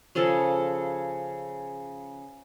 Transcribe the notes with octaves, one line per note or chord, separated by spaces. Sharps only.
C#3 F3 G#4 A4